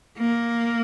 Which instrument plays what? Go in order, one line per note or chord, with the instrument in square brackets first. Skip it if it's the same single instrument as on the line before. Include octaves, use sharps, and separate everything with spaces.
[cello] A#3